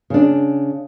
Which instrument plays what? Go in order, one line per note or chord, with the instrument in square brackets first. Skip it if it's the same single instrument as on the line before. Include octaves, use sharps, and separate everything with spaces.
[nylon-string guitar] C#3 D4